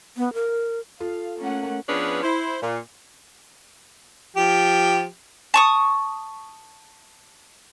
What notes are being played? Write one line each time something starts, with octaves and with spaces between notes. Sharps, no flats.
B3
A#4
F4 A4 F5
A3 A#3 C#4 F#5
F3 B3 C#4 D4 G#4 B4
E4 C5
A#2
F3 G4
A5 C#6 D#6